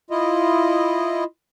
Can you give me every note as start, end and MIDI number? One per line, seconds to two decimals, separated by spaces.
0.11 1.24 64
0.11 1.24 65
0.11 1.24 75